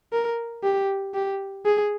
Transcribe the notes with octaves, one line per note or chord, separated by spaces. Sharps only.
A#4
G4
G4
G#4